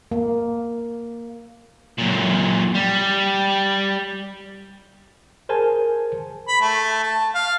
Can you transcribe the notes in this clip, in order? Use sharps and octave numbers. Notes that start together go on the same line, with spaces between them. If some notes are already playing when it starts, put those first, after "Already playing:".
A#3
F#2 A#2
G3
G#4 A#4 C5 G#5 A5
B5
A3
A5
F5